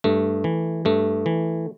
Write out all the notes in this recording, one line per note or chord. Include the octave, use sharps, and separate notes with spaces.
G2 A3
E3
G2 A3
E3